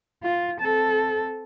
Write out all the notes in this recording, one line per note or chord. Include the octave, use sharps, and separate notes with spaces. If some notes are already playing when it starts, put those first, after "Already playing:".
F4
C4 A4